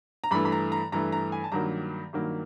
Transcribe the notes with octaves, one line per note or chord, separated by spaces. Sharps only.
A#5
G2 E3 A3 B5
B5
A#5
A#5
G2 E3 A3 A#5
A#5
G#5
A5
G2 D#3 F#3 A#3 A#5
G2 D#3 F#3 A#3